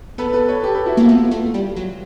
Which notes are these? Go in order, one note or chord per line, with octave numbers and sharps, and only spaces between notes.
B3 A4 B4
A4 B4
B4 C#5
G4 A4
A4 B4
E4 F#4
A#3 E4
B3 F4
A3
G3
F#3